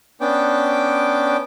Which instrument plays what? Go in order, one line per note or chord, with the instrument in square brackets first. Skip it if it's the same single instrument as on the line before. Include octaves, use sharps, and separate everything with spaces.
[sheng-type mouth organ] B3 C#4 D4 G5 D6